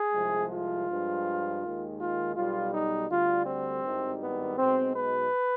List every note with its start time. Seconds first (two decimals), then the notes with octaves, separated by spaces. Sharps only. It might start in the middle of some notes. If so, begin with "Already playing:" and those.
Already playing: G#4
0.13 C2 C3 F3 G#3
0.50 F4
0.88 G2 F3 G#3
1.62 D#2 D#3 G#3
1.99 F4
2.35 B1 B2 G3 F4
2.72 D#4
3.09 D2 D3 G3 F4
3.46 C4
3.83 G#1 G2 D#3 G3
4.20 B3
4.56 B1 B2 G#3 C4
4.94 B4